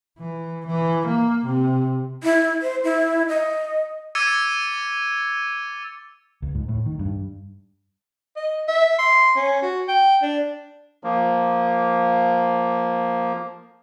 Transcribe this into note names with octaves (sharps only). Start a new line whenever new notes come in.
E3
E3
A#3
C3
E4
C5
E4
D#5
D6 E6 G#6 A6 C#7 D#7
C#2
G#2
A2
D#3
G2
D#5
E5
C6
C#4
F#4
G5
D4
F3 A#3